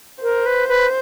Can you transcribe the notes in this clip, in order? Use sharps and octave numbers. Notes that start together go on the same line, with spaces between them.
A#4 C5
B4
B4